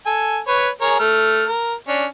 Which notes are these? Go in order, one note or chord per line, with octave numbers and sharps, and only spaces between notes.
A4 G#5
B4 C#5
G#4 A#4 C#5
A3 F6
A#4
C#4 D4